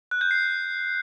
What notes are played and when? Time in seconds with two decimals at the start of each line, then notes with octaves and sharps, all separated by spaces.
0.11 F#6
0.21 G6
0.31 C7